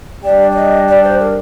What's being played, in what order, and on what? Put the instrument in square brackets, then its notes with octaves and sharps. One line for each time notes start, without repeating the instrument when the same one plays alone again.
[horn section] G3 D4 G4 [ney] D5
[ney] D5
D#5
D5
C5
A#4